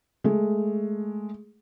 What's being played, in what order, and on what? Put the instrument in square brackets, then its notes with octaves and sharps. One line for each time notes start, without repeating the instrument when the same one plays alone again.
[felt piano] G#3 A3